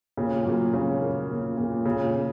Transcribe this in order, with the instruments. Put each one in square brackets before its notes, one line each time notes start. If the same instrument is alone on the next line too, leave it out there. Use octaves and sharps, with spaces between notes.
[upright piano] A#2 [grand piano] C#3
[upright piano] A#2 [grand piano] F#3
[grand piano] C#3 [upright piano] C#4
[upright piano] A#3
A#2
A#2
[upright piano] A#2 [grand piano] C#3
[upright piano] A#2